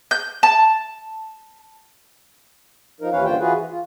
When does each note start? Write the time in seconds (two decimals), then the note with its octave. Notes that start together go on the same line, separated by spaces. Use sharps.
0.11 G6
0.43 A5
3.01 F3 D#4 A#4
3.12 D#2 E3 C#4 B4 C#5 F5
3.25 G2 D3 A#3 F4 C5 G5
3.40 E3 F4 F#4 G#4 B4
3.57 E3
3.71 F4